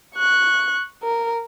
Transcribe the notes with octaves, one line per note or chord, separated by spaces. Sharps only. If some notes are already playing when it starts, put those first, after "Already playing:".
C#6 F#6
A#4